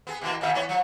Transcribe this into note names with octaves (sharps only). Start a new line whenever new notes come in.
B3 G#4
B2 E3 A#3
A#2 D#3 E5
E3 B3 C#5
F3